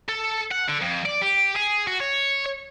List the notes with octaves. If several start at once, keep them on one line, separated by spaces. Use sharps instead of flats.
A4
F#5
D3
F2
D5
G4
G#4
F#4
C#5